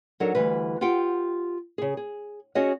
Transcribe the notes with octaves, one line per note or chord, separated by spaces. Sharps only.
F#3 D4 D#4 A4 A#4
D2 E3 G3 B4
F4 G4 F#5 G5
C#3 G#4
G#4
C#4 F#4 G#4 C#5 D#5